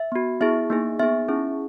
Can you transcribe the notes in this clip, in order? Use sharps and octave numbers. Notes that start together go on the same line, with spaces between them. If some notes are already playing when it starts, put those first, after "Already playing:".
Already playing: E5
B3 F#4
B3 E4 G#4 E5
A#3 D#4 G#4
B3 D#4 G#4 E5
C#4 E4 G#4